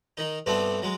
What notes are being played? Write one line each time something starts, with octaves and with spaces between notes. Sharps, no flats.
D#3 D#4
G2 B2 A3 B3 C4 D4
F#3 G#3